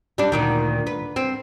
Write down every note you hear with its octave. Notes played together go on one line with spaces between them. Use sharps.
G3 D4
D2 A#2 D#3
B4
C4